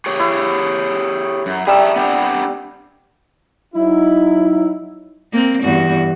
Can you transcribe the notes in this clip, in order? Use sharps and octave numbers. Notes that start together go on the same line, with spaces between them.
G4 G#4 C#5
E4
F#2
G3 G#4 E5 A5 A#5 E6
B3 C4 D4
F#3 D#4 E4
A#3 C4
E2 G2 F#4